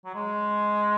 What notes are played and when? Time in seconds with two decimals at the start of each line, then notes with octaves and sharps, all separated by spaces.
0.05 F#3
0.15 G#3